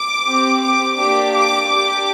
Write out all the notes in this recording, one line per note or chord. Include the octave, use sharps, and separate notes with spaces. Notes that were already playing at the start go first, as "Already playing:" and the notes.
Already playing: D6
C4 G4
D6
A#3 D4 G4 D6
D6
D4 G4 D6